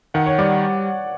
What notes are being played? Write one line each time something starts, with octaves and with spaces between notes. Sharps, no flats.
D#3 F#5
C#5
G3 D5